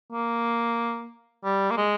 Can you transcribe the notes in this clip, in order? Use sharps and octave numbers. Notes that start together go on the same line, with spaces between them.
A#3
G3
A#3
G#3